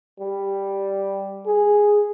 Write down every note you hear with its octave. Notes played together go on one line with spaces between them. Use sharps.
G3
G#4